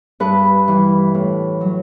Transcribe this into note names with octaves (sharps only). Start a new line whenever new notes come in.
G2 B4
E3 G3
A2
F#3